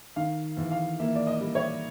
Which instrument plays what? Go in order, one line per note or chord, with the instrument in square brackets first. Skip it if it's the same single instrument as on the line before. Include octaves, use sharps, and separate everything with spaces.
[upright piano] D#3 F5
E2
F5
A#3 E5
D5
D#5
G3
C#5